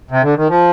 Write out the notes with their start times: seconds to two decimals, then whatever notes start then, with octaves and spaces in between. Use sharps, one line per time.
0.11 C3
0.23 D3
0.36 D#3
0.49 F3